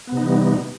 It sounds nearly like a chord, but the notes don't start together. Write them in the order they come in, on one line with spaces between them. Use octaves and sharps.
B3 C3 D#4 E3 G3